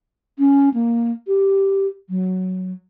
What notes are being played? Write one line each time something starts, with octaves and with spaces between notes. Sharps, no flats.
C#4
A#3
G4
F#3